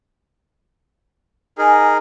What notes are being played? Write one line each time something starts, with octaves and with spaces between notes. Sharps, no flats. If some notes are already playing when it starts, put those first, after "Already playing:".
D#4 G#4 A#4 G#5